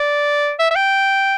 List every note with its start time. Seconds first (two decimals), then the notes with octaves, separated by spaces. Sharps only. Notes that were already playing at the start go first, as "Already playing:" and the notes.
Already playing: D5
0.59 E5
0.71 E5
0.75 G5